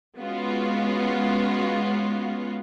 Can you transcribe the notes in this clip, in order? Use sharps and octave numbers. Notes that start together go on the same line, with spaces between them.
G#3 B3 C#4 F4 F#4